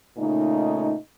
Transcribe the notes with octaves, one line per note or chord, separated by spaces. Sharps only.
A#2 C#3 A3 D#4